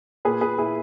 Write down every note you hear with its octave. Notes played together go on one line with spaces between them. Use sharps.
A#2 G#4 B4
A#2 G#4 B4
A#2 E4 G#4